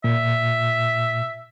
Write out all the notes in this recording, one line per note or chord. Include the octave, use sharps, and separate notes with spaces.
A#2 E5